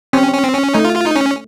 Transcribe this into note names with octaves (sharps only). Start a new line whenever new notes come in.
C4 C#4
C#4
C4
C#4
A3 D#4
F4
F4
D#4
C#4